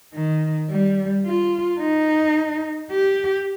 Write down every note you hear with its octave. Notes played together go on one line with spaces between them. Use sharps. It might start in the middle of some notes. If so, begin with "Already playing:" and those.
D#3
G3
F4
D#4
G4